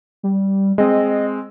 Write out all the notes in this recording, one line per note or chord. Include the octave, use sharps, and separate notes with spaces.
G3
G#3 C4 D#5